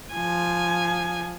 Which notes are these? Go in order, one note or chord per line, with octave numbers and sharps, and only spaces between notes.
F3 G#5